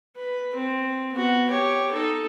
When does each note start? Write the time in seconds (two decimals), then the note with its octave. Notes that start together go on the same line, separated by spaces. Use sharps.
0.17 B4
0.55 C4
1.13 B3 F#4
1.49 G4 C#5
1.92 D#4 A4